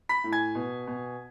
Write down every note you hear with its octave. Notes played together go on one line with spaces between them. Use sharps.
B5 B6
A2
G#5 G#6
B2
B2